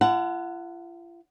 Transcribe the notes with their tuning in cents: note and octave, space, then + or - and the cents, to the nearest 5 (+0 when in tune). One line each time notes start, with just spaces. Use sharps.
F4 -45 F#5 +0 A5 +40